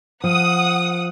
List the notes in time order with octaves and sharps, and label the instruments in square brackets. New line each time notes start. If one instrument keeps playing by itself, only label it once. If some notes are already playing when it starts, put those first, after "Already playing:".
[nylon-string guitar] F3 [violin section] F#5 D#6